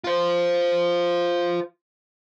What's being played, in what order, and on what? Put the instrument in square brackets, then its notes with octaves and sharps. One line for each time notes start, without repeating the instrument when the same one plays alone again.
[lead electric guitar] F4 C5